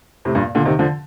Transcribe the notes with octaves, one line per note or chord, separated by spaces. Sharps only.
A2 C3
G2 A#2
A#2 D3
C3 D#3
D3 F3